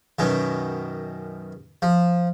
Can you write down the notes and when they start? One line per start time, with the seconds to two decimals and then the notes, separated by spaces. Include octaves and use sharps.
0.19 F#2 B2 D#3
1.82 F3